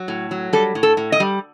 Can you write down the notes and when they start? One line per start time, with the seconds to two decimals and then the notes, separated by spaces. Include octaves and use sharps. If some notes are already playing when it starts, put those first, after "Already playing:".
Already playing: F#3
0.08 A2
0.31 F#3
0.53 G3 A4
0.75 A2
0.83 A4
0.97 A2
1.12 D#5
1.20 G3